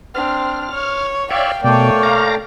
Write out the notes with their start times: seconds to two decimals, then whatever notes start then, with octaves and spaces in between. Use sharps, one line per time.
0.15 C4 D4 F6
0.72 C#5
1.31 C#5 D5 E5 F5 G5
1.64 B2 A3 A#3 C#5 D5 G5
2.03 F5 A#5